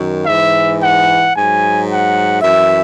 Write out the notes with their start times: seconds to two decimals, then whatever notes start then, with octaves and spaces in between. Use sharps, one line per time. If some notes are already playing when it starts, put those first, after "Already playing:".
Already playing: F#2 D#3 F#3
0.26 G#2 E3 E5
0.80 F#5
1.34 G#2 F#3 G#5
1.88 F#5
2.42 F#2 E3 E5